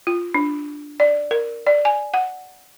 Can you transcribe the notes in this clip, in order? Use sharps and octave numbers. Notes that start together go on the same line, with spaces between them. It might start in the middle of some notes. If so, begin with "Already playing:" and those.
F4
D4
D5
A#4
D5
G#5
F#5